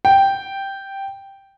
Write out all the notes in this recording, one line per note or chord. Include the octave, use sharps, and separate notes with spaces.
G5